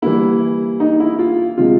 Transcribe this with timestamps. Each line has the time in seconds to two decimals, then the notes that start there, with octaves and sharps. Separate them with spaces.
0.02 E3 G3 A#3 E4
0.80 D#4
1.00 E4
1.19 F4
1.57 C3 F3 G#3 C4 F4